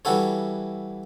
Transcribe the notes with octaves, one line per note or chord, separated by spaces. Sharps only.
E3 G3 E4 F#4 A4 C#5